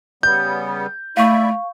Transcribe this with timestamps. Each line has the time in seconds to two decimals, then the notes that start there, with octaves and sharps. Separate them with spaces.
0.23 C#3 G3 B3 G6
1.17 A3 E4 D5 E5 F5 C#6